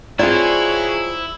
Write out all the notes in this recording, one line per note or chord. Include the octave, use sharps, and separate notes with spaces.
F#3 C4 E4 F4 G#4 C#5 D5